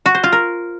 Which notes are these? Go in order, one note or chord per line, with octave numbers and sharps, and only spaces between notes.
F#4
C5
F4
A#4